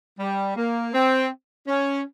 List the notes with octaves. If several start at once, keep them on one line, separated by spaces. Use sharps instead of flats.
G3
A#3
C4
C#4